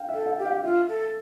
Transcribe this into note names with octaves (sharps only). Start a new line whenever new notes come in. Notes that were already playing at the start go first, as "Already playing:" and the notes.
Already playing: F5 G5
E5
A4
F5
G4
F5
F4 E5
A4